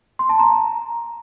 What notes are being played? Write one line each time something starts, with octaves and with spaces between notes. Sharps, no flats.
C6
A5
A#5